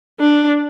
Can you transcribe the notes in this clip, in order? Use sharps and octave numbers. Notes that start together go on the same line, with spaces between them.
D4